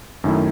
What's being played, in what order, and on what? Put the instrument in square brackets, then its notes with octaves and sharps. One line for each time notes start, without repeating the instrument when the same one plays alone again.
[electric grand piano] F#2 D#3 A3 E4